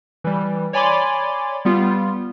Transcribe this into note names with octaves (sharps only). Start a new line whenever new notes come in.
E3 G3
C#5 D5 G#5 B5 C6 D6
G3 B3 F4